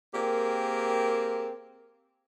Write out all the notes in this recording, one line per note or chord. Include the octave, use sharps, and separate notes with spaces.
A#3 C4 G4 G#4 A#4